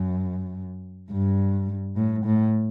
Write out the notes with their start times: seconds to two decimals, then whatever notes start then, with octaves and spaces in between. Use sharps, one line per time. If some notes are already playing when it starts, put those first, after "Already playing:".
Already playing: F#2
1.11 G2
1.96 A2
2.25 A2